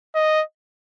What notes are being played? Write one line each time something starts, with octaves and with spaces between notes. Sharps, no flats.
D#5